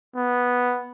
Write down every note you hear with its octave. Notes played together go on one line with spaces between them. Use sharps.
B3